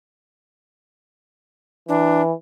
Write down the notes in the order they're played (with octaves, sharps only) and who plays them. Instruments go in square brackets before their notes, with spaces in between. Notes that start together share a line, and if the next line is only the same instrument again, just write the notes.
[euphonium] E3 [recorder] D4